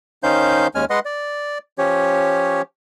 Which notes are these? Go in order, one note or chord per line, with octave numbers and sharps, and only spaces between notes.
D#3 C#4 D#4 C5 F5 G6
D#2 G#3 C#4 G#5 F6
G#3 B4 D#5 F#5 C6
D5
F3 C#4 G4 C#5